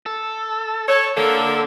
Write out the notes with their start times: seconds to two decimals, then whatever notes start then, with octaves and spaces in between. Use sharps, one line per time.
0.06 A4
0.88 A4 C#5
1.17 D3 A#3 A4